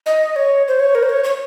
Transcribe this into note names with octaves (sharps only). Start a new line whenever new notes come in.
D#5
C#5
C5
C#5
A#4
C5
C#5
C#5